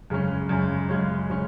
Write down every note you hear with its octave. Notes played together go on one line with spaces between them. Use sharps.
F#2 C#3 G#3 C#4
F#2 C#3 G#3 C#4
F#2 C#3 G#3 C#4
C#3 G#3 C#4